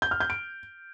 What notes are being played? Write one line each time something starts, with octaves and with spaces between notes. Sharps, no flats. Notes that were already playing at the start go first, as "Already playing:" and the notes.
G6
F6
G6
D7